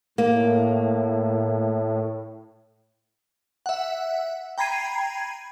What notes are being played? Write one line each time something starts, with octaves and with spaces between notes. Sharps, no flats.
A2 A#3
E5 F#5
G5 A#5 B5 G#6 C7 D#7